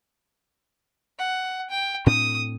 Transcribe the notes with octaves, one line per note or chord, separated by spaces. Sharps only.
F#5
G5
A2 C4 D4 D#6